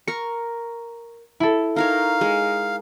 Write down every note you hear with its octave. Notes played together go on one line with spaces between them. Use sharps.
A#4 C#6 C#7
E4 A4
D#4 A#4 C#5 F5
G#3